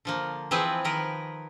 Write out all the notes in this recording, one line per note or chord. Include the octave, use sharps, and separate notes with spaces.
D3 F3 A#3
E3 F3 C4 G#4 B4
D#3 F3 A#4 B4